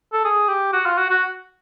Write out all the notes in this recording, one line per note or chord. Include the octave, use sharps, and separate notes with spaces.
A4
G#4
G4
F#4
F4
F#4
F#4